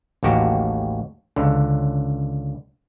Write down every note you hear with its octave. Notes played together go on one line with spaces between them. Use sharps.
A1 D#2 F#4 G4
C#2 D3